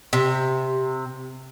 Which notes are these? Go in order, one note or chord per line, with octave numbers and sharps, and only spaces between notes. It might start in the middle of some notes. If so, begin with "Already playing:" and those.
C3